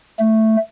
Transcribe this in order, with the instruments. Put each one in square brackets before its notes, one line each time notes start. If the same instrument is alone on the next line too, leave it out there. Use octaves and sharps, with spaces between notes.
[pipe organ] A3